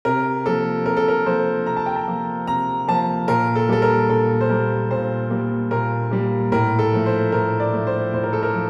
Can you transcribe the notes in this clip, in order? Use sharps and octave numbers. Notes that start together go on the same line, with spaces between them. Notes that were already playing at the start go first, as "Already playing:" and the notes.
C3 A#4
F3 A#3 A4
C3 A#4
A4
A#4
F3 A#3 C5
C3 A#5
A5
G5
A5
F3 A#3
C3 A#5
F3 A#3 A5
A#2 A#4
A4
G3 A#3 A4
A#4
A#2 A4
C5
G3 A#3 A#4
A#2 C5
G3 A#3
A#2 A#4
G3 A#3
A2 A#4
A4
F3 A3
C5
A2 A#4
D5
F3 A3
C5
A2 C5
A#4
A4
A#4
F3